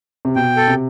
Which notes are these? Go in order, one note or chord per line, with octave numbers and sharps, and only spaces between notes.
C3
B2 G5
A4
C3